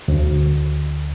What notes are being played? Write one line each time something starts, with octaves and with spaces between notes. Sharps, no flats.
D2